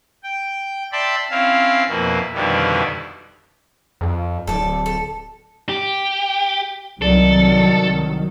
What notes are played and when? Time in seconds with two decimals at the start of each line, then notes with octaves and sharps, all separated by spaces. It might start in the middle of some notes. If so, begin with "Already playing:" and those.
0.24 G5
0.92 D5 E5 G5 A5 B5 C6
1.30 C4 C#4 E4 F5
1.88 F2 B2 A#3 E4
2.34 F2 B2 D3 D#3 G3 E4
4.01 F2
4.47 D1 A4 D5
4.86 A4
5.69 G4
7.02 C2 D#3 F#3 A4 D5